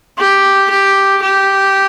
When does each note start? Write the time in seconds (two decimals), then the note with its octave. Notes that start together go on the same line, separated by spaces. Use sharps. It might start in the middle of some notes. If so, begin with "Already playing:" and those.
0.18 G4
0.70 G4
1.23 G4